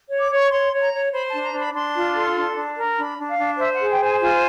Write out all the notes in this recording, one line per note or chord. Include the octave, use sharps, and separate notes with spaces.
C#5
D6
C#5 C#6
C#5 C6
C#5
A#5
C#5
C5 B5
D4 A5
A#5
D4
B5
D4 C6
F4
A4
D4
D4
A#4
D4 B5
D4
F5
D4
C5 E5
F#5
G#4
G5
C5
G#5
F4 G#5